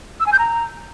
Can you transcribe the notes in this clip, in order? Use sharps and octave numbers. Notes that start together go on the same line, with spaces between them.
E6
G#5
G6
A#5